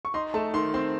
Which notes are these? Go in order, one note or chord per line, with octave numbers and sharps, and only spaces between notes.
C#6
D#4 C6
A3 A5
D#3 C6
C4 C6